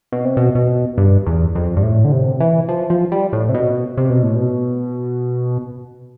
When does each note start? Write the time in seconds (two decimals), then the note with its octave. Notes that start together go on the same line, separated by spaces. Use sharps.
0.12 B2
0.25 C3
0.37 B2
0.55 B2
0.98 G2
1.27 E2
1.55 F2
1.77 G2
1.83 A2
2.05 D3
2.12 C3
2.40 E3
2.69 F3
2.90 F3
3.12 G3
3.33 A2
3.49 C3
3.54 B2
3.97 C3
4.10 B2
4.23 A2
4.35 B2